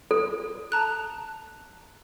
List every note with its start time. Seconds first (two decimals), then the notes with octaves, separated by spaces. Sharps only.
0.11 A4
0.72 A5 A#5 F#6